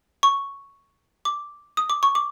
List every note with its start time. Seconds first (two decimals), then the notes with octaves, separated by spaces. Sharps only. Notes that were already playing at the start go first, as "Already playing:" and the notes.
0.23 C#6
1.25 D6
1.77 D#6
1.90 D6
2.03 C#6
2.15 D6